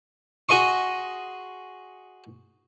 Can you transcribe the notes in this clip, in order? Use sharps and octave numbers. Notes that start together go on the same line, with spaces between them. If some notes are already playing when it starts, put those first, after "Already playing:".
F#4 G#4 D#5 C6 C#6